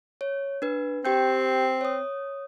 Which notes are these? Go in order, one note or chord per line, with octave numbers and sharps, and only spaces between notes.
C#5
D4 B4
C4 G4 G5 G6
C#5 D#6